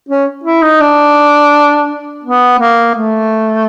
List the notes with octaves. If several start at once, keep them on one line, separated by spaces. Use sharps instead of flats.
C#4
E4
D#4
D4
B3
A#3
A3